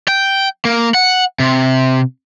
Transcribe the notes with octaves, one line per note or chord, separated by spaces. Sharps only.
G5
A#3
F#5
C3